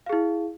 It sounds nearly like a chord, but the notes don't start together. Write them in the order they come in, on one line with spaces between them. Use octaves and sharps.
F5 G#4 E4